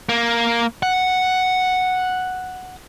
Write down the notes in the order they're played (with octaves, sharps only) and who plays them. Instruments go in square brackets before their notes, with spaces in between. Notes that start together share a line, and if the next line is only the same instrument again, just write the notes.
[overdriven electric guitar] A#3
F#5